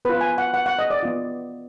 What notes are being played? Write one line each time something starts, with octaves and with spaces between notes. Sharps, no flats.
B3 F4 B4
G#5
F#5
F#5
F#5
D#5
D5
B3 F4